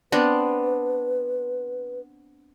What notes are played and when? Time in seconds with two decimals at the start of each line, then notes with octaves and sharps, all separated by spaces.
0.12 B3 C4 D4 B4